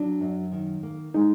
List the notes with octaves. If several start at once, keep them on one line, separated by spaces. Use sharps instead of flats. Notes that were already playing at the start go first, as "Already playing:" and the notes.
Already playing: F#3 D4
F#2
D#3
A#3
G#3 D#4